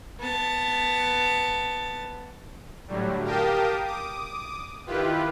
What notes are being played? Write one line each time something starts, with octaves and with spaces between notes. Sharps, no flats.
B3 A5
A2 D3 F#3 G3
G4 A#4 F5 G5 A5 D#6
D6 D#6
D#3 E4 F4 G4 B4